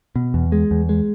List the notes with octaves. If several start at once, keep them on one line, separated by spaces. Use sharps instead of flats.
B2
E2
G#3
E2
G#3